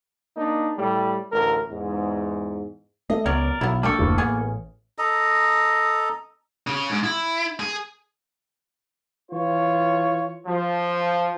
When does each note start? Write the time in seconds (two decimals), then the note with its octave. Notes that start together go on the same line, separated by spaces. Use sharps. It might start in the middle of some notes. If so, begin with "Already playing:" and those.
0.36 A#3 D4 D#4
0.77 A2 G3
1.32 A1 D2 A#4
1.70 E2 G#2
3.10 A3 D#5
3.26 C#2 F#3 B3 A#4 D5
3.61 B1 B3 E4
3.83 A#3 D4 G4 A4 C#6
3.99 F1 D2 A2
4.18 A1 B3 G#4
4.98 A4 D#5 A#5
6.67 C#3 C#4
6.90 G#2
7.03 E4
7.60 G#4
9.31 E3 F4 C#5
10.46 F3